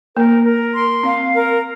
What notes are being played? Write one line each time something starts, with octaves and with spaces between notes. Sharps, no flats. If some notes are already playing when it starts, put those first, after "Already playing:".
A#3 A#4
A#4
C6
C4 F5
A#4